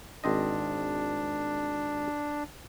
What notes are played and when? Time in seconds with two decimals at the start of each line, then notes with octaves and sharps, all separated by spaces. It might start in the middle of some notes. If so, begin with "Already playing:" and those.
0.24 G#1 C4 D4 D#5